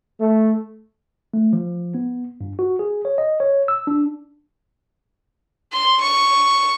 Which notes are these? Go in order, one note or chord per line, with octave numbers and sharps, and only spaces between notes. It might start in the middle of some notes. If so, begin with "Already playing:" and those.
A3
A3
F3
B3
G2
F#4
G#4
C#5
D#5
C#5
E6
D4
C6
C#6